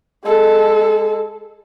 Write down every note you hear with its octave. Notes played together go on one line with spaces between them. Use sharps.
G#3 A4